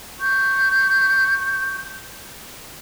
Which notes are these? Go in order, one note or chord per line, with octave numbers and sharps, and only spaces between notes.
C#6 G6